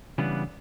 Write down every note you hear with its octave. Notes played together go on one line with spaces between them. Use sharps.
C#3 E3 G3 B3 D4